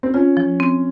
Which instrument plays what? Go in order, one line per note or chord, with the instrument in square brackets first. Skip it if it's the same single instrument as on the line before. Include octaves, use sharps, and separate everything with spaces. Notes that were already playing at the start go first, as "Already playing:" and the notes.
[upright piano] C4
[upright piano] C#4 [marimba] F4
[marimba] F3
C4